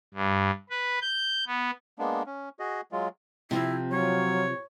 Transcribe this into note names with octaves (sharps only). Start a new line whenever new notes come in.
G2
B4
G6
B3
G#3 A#3 B3 D4
C#4
F#4 G#4 D#5
F#3 G#3 F4
C3 F3 C4 E4
F#3 F4 C#5